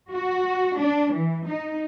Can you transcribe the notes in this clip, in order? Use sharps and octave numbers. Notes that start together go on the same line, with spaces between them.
F#4
D4
E3
D#4